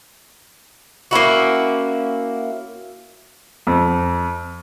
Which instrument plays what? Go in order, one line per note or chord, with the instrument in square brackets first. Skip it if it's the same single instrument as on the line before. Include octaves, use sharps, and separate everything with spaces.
[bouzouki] A#3 C#4 E4 F#4
[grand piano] F2